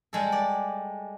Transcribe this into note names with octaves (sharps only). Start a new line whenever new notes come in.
G3 G#3 A4
D5